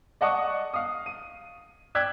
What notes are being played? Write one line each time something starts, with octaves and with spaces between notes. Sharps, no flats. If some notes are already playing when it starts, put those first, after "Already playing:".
D5 D#5 F#5 A5 C#6 D#6
F5 D#6
D#7
D5 G5 E6 F#6 G#6 B6